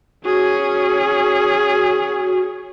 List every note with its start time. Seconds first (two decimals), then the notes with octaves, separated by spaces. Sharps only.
0.25 C#4 F#4 G#4